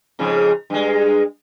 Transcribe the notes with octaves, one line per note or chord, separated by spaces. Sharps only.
F2 G#2 C#3
G2 G#3